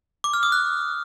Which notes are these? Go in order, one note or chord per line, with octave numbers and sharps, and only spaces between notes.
D6
F6
D#6
F#6